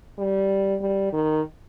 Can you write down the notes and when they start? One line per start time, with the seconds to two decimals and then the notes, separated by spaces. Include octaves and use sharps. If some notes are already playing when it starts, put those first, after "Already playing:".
0.18 G3
0.81 G3
1.13 D#3